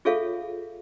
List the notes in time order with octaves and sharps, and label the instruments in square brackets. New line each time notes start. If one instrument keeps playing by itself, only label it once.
[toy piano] F4 G#4 A4 C#5 E5 F5